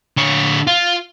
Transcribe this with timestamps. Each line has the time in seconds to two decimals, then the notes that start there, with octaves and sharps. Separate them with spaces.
0.17 D3 C#5
0.67 F4